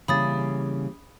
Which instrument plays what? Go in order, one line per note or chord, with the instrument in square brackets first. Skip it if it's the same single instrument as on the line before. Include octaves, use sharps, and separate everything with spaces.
[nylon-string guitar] C#3 [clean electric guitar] E3 G3 A#3 [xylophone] B5 D#6 A6